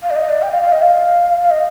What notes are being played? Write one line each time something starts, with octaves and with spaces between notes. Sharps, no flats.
F5
D5
D#5
D5
G5
F5
F5
D#5
F5
F5
D#5